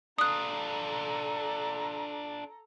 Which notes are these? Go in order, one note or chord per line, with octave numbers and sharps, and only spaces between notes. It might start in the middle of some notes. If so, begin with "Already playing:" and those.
D4 F4 A4 A#5 D#6 F#6